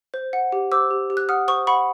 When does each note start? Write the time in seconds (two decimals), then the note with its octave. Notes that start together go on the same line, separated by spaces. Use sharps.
0.14 C5
0.33 F#5
0.52 G4
0.72 C5 D6 E6
0.91 G4
1.10 G4
1.17 F#6
1.29 F#5 D#6 F6
1.48 C5 C#6 D#6
1.67 F#5 B5 C#6